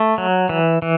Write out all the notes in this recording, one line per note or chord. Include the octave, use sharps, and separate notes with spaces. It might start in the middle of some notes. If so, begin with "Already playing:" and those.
Already playing: A3
F#3
E3
E3